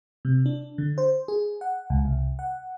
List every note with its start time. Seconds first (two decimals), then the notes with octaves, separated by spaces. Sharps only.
0.25 C3
0.46 D4
0.78 D3
0.98 C5
1.28 G#4
1.61 F#5
1.90 C#2
2.05 C2
2.39 F#5